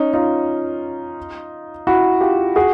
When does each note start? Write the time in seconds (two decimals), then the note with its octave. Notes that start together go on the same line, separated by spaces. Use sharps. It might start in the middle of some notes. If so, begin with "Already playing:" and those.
Already playing: C#4 D#4
0.14 D#4 F4
1.87 E4 F#4
2.21 F4 G4
2.56 F#4 G#4